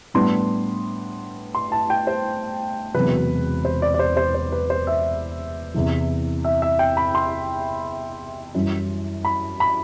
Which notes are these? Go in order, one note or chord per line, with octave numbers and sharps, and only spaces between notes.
A2 G3 B3 D4 C6
C6
A5
G5
C5
E1 E2 C3 F#3 B4
C5
D5
D5
C5
C5
C5
B4
C5
E5
E2 C3 E3
E5
E5
G5
B5
C6
F#2 E3 G3
B5
B5